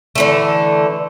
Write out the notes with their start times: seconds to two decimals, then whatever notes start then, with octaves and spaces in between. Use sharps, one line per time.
0.15 D3 E3 A3